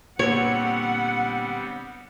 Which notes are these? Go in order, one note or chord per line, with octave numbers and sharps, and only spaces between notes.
A#2 D3 G3 B3 C4 C#5 F#5